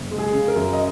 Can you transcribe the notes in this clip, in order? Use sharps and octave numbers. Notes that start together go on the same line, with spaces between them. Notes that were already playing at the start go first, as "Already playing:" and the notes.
Already playing: F#1
G#3
G#4
C#3
A#4
F#2
D#5